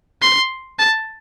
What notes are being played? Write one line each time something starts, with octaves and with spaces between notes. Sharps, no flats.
C6
A5